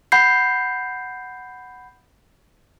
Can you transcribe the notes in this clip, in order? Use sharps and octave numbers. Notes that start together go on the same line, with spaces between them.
F#5 B5 G6 C7